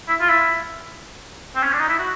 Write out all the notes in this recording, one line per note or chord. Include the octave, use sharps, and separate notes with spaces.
E4
F4
E4
C4
C#4
D4
D#4
E4
F#4